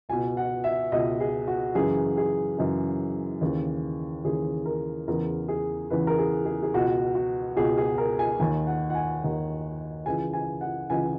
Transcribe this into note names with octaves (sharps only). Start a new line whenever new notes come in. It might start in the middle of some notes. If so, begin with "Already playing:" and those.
C#2 B2 G#5
F#5
E5
C#2 B2 D#5
G#4
F#4
F#2 C#3 E3 G#4
G#4
F#2 C#3 E3
D#2 C#3 E3
D#2 C#3 E3 G#4
A#4
E2 C#3 E3 A#4
G#4
E2 C#3 E3 B4
A#4
G#4
G#4
G#4
C#2 B2 F#4
F#4
C#2 B2 G#4
G#4
A#4
G#5
D#2 D#3 G#5
F#5
F#5
G#5
D#2 D#3
C#2 C#3 E3 G#5
G#5
F#5
C#2 C#3 E3 G#5